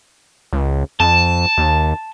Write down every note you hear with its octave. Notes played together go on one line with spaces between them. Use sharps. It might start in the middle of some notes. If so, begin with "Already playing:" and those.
C#2
F2 A5
D#2